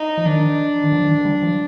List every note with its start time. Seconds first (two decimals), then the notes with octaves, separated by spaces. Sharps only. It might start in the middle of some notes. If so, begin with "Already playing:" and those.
Already playing: D#4
0.17 F3
0.26 D#3 D4
0.84 D#3
0.93 F3
1.09 D#3
1.25 G3
1.43 F3